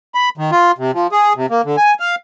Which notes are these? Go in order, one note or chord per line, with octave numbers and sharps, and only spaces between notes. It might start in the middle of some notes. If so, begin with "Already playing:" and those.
B5
D#3
F4
C3
F3
G#4
C3
A#3
D3
G#5
F5